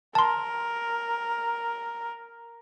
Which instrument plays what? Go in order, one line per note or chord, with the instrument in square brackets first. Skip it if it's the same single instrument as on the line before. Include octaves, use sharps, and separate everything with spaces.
[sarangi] A#4 [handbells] A5 C6